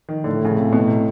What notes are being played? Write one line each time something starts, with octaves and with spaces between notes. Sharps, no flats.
D#3
A2 D3
C#3
C3
B2
C3